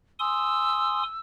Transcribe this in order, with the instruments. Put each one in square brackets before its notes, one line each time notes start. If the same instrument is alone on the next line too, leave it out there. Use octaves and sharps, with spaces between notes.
[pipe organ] G#5 C6 D#6 [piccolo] E6